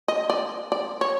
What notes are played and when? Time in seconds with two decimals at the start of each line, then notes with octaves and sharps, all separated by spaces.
0.08 D#5
0.30 D5
0.72 D5
1.01 C#5